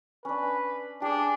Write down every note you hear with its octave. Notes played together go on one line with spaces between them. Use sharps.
C#4 D4 B4
D4 G4 G#4 G#5